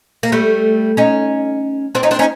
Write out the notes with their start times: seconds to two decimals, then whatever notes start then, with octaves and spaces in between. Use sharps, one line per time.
0.23 A#3
0.32 G3 A3
0.97 C#4 D#4
1.95 C4 D4
2.03 C#4 D#4
2.11 C4 D4
2.19 C#4 D#4